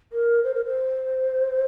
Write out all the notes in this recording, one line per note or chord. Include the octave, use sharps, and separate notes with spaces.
A#4
C5
A#4
C5